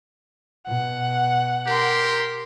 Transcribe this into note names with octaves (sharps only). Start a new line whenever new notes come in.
B2 F#5
G4 A#4 C6